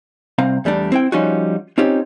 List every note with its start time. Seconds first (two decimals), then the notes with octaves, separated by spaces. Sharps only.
0.38 C2 C4 F5 A#5
0.65 E2 G3 A3 D4
0.92 C4 E4 G5
1.12 F3 G3 C#4 D#4 F4 F#4
1.78 C4 C#4 D#4 F4 G4